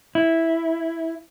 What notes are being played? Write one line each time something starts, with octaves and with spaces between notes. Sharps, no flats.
E4